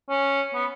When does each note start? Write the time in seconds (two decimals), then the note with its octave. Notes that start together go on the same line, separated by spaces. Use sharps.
0.09 C#4
0.54 B3